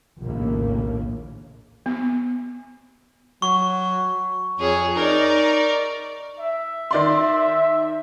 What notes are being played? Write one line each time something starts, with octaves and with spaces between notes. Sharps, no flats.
A#1 D#2 A2 C#3 A#3
B3
F#3 C#6
F2 G#4 C#5
D#4 A#4 D5
E5
D#3 D5 C6